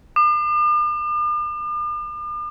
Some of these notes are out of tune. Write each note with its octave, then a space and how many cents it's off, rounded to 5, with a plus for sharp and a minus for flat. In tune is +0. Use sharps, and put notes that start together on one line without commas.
D6 +45